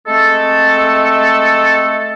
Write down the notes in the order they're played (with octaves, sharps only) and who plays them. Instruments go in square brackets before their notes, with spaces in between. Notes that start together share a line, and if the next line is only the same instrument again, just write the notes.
[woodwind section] G#3 A3 C4 A4